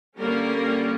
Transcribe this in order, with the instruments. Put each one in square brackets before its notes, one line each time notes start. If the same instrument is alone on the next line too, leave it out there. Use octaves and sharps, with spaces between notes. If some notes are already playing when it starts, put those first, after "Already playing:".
[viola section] D3 G3 A#3 C#4 A#4